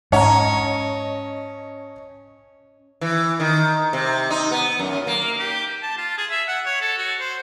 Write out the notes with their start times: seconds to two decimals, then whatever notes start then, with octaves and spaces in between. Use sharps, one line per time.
0.12 G#2 C#4 C#5 D#5 F#5 A5 A#5
3.01 E3
3.40 D#3
3.93 C3
4.30 D#4
4.51 B3
4.80 F#2
5.07 A#3
5.39 G4
5.82 A5
5.97 F4
6.18 G#4
6.30 E5
6.48 F#5
6.66 C#5
6.81 A4
6.98 F#4
7.20 C5